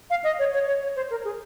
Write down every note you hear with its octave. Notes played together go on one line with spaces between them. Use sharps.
F5
D#5
C#5
C#5
C#5
C#5
C5
A#4
G#4